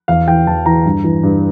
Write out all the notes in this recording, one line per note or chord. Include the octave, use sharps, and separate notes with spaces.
E2 F5
E3 G5
E2 A5
E3 A#5
G2
E3
G2